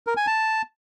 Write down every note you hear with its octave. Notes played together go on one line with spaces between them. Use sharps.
A#4
G#5
A5